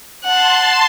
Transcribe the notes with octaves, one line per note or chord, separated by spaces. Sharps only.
F#5 A5 C6